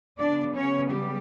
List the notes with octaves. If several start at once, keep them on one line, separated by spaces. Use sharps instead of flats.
C#3 F#3 B3 D4 D5
C#4 C#5
G3 G4